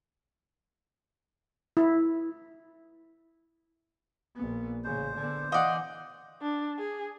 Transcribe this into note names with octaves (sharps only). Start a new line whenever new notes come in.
E4
A#1 B3
A1 C#3 C5
D3 B3
E3 D5 D#5 F5 F#5
D4
G#4